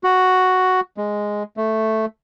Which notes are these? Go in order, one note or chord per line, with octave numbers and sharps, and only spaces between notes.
F#4
G#3
A3